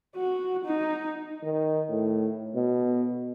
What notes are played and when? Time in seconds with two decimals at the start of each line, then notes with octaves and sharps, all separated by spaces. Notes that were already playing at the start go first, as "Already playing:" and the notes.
0.16 F#4
0.65 D#4
1.43 D#3
1.89 A2
2.55 B2